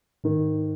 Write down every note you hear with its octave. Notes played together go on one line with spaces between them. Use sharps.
G#2 D#3